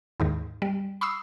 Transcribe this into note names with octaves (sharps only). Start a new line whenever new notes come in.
D#2 G#2 D#3
G3
B5 C#6 D#6 E6 C7